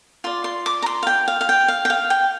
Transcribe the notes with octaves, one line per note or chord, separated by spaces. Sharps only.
F4 D5 C6
C6
D6
A#5
C6
F5
G5
F5
F5
G5
F5
G5
F5
G5